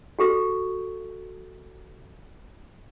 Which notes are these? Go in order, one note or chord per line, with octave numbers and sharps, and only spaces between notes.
F#4 G4 A4